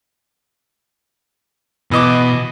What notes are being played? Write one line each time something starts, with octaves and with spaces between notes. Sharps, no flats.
B2 E3 D#5 D6